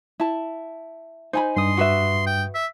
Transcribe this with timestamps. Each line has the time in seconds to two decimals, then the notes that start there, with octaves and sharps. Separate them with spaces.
0.20 E4 A5
1.33 D#4 C5 G#5 B5
1.57 G2 C6 D#6
1.77 F#4 B4 E5
2.26 G5
2.55 E5